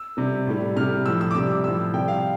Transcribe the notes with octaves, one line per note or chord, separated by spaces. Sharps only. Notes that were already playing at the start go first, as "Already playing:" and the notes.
Already playing: E6
C3 G3
A2 G3
C3 G3 F6
A2 F3 E6
E6
D6
C3 G3 E6
A2 F3 E6
C3 G3 G5
F5